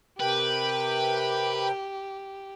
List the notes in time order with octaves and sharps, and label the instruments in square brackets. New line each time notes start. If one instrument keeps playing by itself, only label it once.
[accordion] C3 G5 [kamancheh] G4 [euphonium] A#4 [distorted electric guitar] B4